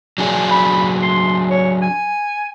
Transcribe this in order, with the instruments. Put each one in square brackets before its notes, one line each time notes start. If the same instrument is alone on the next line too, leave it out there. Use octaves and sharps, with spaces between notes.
[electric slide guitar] F#3 D4 G#4
[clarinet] B5
C6
C#5
G#5